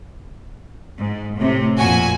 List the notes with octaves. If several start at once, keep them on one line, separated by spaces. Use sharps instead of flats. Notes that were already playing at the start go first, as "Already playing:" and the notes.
G#2
A2 C3
F2 A#2 F#4 G#5